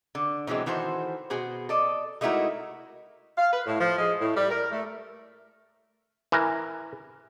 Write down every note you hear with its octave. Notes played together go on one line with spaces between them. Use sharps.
D3
B2 E3 F#3 G#3 C4
D#3 E3 F#4 A4 C5
B2 F#4 G#4 C5
A4 D5 D#5
G#3 A3 D#4 E4 F#4 A#4
F5
B4
A2
F3
G#3
A2
G3
A#4
A3
E3 A#4